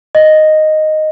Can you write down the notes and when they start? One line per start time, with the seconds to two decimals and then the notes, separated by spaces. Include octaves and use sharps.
0.15 D#5